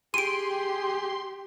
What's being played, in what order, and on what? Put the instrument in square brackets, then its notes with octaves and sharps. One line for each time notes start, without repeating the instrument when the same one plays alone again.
[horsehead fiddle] G4 [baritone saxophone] G#4 [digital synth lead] C6 [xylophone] D7 D#7